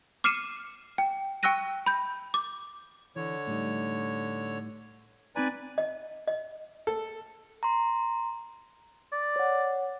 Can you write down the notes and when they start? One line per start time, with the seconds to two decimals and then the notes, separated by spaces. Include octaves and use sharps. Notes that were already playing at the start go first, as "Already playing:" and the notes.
0.24 D6 F6 C7 C#7 D#7 E7
0.98 G5
1.43 G5 C#6 E6 F#6 A#6 D#7
1.86 B5 G6
2.34 D6
3.16 D3 E3 C#5
3.47 A2 G3 D#4
5.36 C4 D#4 B4 D5 G#5 A#5
5.78 D#5
6.28 D#5
6.87 A4
7.63 A#5 C6
9.12 D5
9.36 C#5 F#5